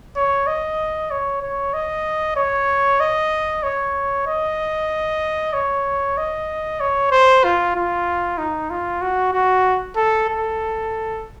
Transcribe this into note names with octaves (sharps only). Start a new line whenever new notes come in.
C#5
D#5
C#5
C#5
D#5
C#5
D#5
C#5
D#5
C#5
D#5
C#5
C5
F4
F4
D#4
F4
F#4
F#4
A4
A4